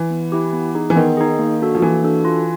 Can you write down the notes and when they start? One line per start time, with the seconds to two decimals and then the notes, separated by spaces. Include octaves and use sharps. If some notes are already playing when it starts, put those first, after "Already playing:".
Already playing: E3
0.10 B3
0.32 E4 G4
0.53 B3
0.75 D#4 G#4
0.90 E3
0.96 D#3 B3
1.17 D#4 G#4
1.39 A#3
1.61 D4 F#4 A4
1.75 F3
1.82 E3 A#3
2.03 D4 F#4 A4
2.25 F4